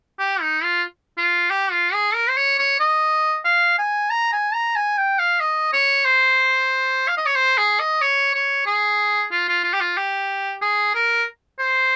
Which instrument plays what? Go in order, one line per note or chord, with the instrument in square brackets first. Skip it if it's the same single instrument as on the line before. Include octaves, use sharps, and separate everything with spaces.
[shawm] G4
D#4
F4
F4
G4
F4
G#4
A#4
C5
C#5
C#5
D#5
F5
G#5
A#5
G#5
A#5
G#5
G5
F5
D#5
C#5
C5
F5
D#5
C#5
C5
G#4
D#5
C#5
C#5
G#4
F4
F4
F4
G4
F4
G4
G#4
A#4
C5